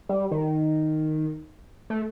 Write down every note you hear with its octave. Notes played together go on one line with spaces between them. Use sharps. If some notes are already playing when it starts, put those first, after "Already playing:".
G3
D#3
A3